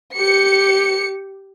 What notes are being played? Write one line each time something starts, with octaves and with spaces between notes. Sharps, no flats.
G4 C#7